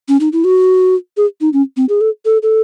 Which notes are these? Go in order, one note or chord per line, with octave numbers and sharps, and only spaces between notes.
C#4
D#4
E4
F#4
G#4
D#4
C#4
C4
G#4
A4
A4
A4